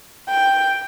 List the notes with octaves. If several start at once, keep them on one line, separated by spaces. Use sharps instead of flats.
G5